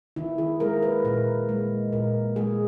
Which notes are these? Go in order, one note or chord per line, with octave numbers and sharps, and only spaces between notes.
D#3 E4
G#4
G#3 A#4
B4
A#2 A#4
G#3
A#2 A#4
G#3 G#4